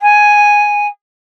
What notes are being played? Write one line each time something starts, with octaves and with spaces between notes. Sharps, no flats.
G#5